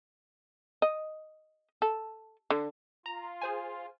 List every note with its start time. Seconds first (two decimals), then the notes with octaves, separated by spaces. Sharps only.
0.82 D#5
1.82 A4
2.50 D3
3.06 F4 A#5
3.42 G#4 C5 G#5